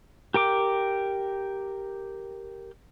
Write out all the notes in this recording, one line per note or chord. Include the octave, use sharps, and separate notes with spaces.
G4 A#4 G5 D6